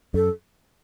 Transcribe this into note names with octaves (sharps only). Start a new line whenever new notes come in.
F#2 A4